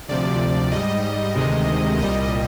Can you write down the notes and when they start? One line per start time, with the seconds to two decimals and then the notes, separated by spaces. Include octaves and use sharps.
0.09 D2 C3 F3 D5
0.72 G#2 G3 D#5
1.35 D2 C3 D#3 G#3
1.99 C2 A#2 G3 D#5
2.20 D#5